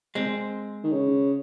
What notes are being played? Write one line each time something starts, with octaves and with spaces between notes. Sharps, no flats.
G#3 C4
D#3
C#3